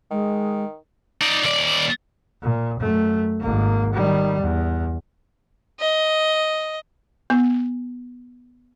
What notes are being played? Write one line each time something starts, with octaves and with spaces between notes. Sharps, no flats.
D#3 G#3
D#4 D5
D#2 D5
A#2
F#2 A3
G#1 A#3
D#3 G3
E2
D#5
B3